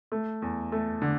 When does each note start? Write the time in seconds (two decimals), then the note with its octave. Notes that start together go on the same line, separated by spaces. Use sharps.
0.12 A3
0.42 E2
0.72 A3
1.02 D3